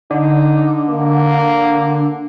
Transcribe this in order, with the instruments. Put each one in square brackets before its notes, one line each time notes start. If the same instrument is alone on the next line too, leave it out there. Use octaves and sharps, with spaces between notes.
[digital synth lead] D3 [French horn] D#4
[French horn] A#3